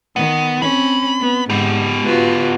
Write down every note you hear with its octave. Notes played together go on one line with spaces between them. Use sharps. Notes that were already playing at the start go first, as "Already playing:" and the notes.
D#3 B3
C4 C#4 B5
B3
G#2 B3 G4
F4 F#4 B4